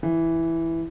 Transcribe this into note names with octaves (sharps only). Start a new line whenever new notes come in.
E3